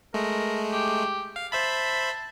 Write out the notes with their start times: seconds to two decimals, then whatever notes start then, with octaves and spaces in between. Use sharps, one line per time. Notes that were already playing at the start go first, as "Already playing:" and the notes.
0.14 G#3 A3 A#4
0.72 G4
1.36 F5
1.52 C5 E5 A5 B5